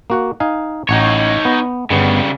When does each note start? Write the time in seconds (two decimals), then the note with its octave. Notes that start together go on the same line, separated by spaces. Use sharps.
0.10 A#3 F#4 F#5
0.40 D#4 F5 G#5
0.89 A1 D#4 C#5 F#5
1.45 B3
1.90 G1 C#3 G3 B3